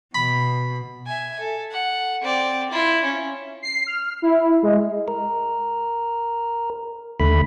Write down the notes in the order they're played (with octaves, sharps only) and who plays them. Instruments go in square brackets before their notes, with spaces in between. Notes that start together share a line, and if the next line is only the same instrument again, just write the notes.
[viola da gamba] B2 [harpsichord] B5
[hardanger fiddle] E5 G#5
A4
F#5
C4 D5
E4 F4
C#4
[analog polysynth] C7
F6
E4
G#3
[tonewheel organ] A#4
D#2 D3 A3 B5